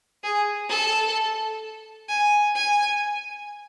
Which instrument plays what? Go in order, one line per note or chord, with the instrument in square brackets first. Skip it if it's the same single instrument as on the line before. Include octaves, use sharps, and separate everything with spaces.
[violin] G#4
A4
G#5
G#5